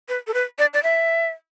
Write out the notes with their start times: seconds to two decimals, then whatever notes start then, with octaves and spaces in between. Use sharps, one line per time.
0.09 B4
0.27 A4
0.34 B4
0.59 D5
0.74 D5
0.83 E5